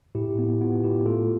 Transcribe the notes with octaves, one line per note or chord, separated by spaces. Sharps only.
A2 E4 G4
B3
B3 F4
A2 E4 G4
A3 F4 A4